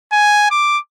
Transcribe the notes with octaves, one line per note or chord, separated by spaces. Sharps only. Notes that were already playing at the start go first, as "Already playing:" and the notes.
G#5
D6